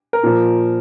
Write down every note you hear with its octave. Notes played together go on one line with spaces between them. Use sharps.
A#4
A#2 F3